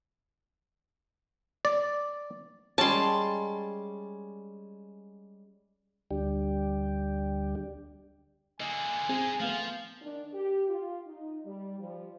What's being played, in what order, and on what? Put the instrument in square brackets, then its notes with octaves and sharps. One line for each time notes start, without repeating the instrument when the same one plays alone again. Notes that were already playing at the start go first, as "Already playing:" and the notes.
[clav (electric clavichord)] D5
[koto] G3 G#3 C#4 [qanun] A5 C6
[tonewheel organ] D2 G3 D4 G4
[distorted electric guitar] D3 A#3 [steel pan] D#5 [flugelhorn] G#5
[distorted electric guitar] G#3 D#4 [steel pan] C4 G#4
[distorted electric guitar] F3 [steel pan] A3 B3 [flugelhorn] F5
[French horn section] D#3 D4
G4
F4
D#4
G3
F3 G3